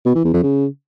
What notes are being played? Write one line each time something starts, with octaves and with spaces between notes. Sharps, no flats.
B2
E3
E2
F2
C#3